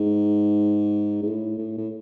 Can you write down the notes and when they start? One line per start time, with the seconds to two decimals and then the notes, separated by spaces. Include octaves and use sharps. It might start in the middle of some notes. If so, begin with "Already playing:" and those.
Already playing: G#2
1.23 G#2
1.27 A2
1.58 A2
1.77 A2